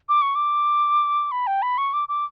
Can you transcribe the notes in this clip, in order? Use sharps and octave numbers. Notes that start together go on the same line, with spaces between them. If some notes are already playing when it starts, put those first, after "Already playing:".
D6
C#6
D6
B5
G5
B5
C#6
D6
D6